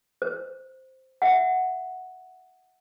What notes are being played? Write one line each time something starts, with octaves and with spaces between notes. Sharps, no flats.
C5
E5 F#5